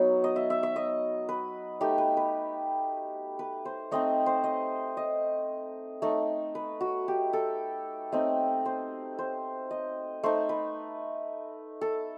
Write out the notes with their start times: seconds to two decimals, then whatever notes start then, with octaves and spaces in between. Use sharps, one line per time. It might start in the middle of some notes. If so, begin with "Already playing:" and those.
Already playing: F#3 B3 D#4
0.24 D#5
0.36 E5
0.50 E5
0.63 E5
0.76 D#5
1.29 B4
1.81 A3 D#4 G4
1.98 B4
2.17 B4
3.39 B4
3.65 C5
3.91 A3 C4 D#4 D#5
4.26 C5
4.44 D#5
4.97 D#5
6.02 A3 D#4
6.55 B4
6.81 F#4
7.08 G4
7.33 A4
8.12 A3 C4 D#4 D#5
8.65 C5
9.19 C5
9.71 D#5
10.23 A3 D#4 C5
10.49 B4
11.81 A4